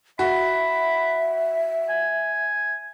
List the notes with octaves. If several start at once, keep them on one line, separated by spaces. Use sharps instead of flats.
F#4 E5 B5
G#5